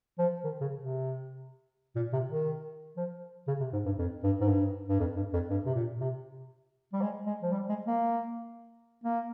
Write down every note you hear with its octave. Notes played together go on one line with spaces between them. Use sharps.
F3
D#3
C#3
C3
A#2
C3
D#3
F3
C#3
C3
G#2
G2
F2
G2
G#2
G2
G2
F2
G2
F2
G2
C3
A#2
C3
G3
G#3
G#3
F3
G3
G#3
A#3
A#3